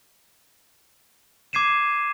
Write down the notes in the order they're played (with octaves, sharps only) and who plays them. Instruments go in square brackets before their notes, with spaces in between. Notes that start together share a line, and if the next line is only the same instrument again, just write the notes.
[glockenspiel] D6 G#6 C7 D#7 E7